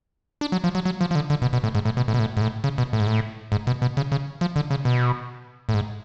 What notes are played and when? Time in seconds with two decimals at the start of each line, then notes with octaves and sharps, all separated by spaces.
0.41 D4
0.52 F#3
0.64 F3
0.75 F#3
0.85 F#3
1.01 F3
1.11 F3
1.15 D3
1.30 D3
1.42 B2
1.53 B2
1.64 A2
1.75 G#2
1.85 A2
1.97 B2
2.08 A2
2.14 B2
2.19 A2
2.37 G#2
2.41 A2
2.64 C#3
2.78 B2
2.93 A2
3.00 G#2
3.07 A2
3.52 G#2
3.67 B2
3.82 B2
3.97 C#3
4.12 C#3
4.41 F3
4.56 D3
4.71 C#3
4.85 B2
5.69 A2
5.74 G#2